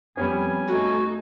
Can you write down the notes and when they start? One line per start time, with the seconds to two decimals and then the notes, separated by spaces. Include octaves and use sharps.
0.17 F2 G3 B3 C#4 G#5
0.68 A3 D#4 F#4